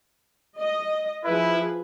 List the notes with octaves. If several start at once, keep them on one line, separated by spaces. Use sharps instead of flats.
D#5
F3 E4 G#4 B4